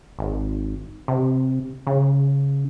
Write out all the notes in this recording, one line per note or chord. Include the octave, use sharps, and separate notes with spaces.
G#1
C3
C#3